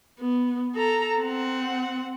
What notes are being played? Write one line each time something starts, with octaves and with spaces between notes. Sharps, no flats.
B3
A4 A#5
C4 F#5